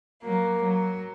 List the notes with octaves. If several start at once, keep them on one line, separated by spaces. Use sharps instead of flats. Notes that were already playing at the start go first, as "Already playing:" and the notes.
F#3 A#3
F#3